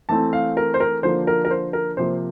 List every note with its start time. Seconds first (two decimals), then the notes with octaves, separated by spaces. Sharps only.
0.09 E3 A3 C4 A5
0.33 F5
0.57 A#4
0.74 C5
0.80 A#4
1.03 D3 F3 A#3 D4 C5
1.27 A#4
1.45 A#4
1.51 C5
1.73 A#4
1.97 C3 F3 A#3 C5